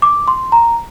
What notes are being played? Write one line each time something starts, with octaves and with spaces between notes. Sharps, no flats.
D6
C6
A#5